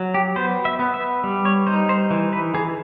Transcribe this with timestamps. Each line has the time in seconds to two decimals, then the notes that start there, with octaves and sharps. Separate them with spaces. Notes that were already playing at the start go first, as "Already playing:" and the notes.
Already playing: F#3
0.14 G4
0.36 B3 C5
0.65 E5
0.79 B3
0.94 E5
1.24 G3
1.45 C#5
1.67 D#4 C5
1.89 C5
2.11 E3
2.33 B4
2.54 E3 G#4